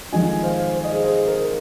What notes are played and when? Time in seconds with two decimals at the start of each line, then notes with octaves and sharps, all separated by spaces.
0.12 F2 D#3 G#3 F4 D#5 G#5
0.43 C5 F5
0.75 C5
0.84 D#5
0.92 G#4 C5
1.04 G#4 C5
1.28 A#4